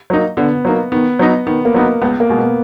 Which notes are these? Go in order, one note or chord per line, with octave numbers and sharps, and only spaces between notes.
F#3 A#3 D#4
D3 B3
F#3 A#3 D#4
D#3 B3
F#3 B3 D#4
D#3 B3
A#3
F#3 B3 D#4
C#2 B3
A#3
B2 G#3
B3